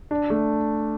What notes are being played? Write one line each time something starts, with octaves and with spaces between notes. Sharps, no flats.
D4
A3